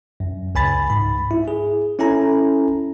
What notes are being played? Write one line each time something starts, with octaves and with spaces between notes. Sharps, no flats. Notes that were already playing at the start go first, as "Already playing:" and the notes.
F#2
C#2 G#5 B5 A6
G#2 B5
E4
G#4
C#4 E4 A4 G#5 A#5